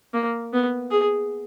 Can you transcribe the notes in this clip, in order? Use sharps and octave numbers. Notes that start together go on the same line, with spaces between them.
A#3
B3
G#4